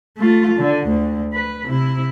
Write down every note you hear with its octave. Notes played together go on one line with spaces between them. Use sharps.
A3 F4
D3
D2
B4
C3 E4